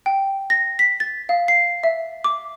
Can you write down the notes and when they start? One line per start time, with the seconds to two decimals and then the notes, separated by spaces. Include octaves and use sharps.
0.06 G5
0.50 A#6
0.79 B6
1.00 A6
1.29 F5
1.48 C7
1.84 E5
2.24 D6